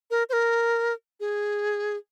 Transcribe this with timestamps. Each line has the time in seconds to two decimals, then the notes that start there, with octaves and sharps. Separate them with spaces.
0.11 A#4
0.29 C5
0.33 A#4
1.20 G#4